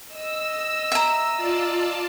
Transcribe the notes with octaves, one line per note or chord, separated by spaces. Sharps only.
D#5 E6
E5 A#5
F4 D5 A5